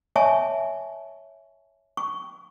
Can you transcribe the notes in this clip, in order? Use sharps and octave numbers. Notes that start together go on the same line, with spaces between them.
C#5 D#5 E5 G#5 A5 C#6
C#6